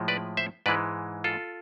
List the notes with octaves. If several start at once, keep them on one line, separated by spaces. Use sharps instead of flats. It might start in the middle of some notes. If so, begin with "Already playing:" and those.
Already playing: A2 F3 G#3
B4 D5
C5 E5
G#2 E3 G#3 B4 D5
F4 A4